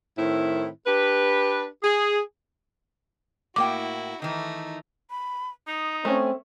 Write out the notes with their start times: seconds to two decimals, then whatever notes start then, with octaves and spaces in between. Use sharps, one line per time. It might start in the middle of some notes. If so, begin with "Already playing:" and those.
0.18 A2 D#3 C4 E4
0.86 D4 G4 B4
1.83 G#4
3.56 A2 A#3 E4 F#4 G5 D6
4.22 D#3 E3 A3 D#4
5.10 B5
5.67 D#4 D#6
6.05 A3 C4 C#4 G#5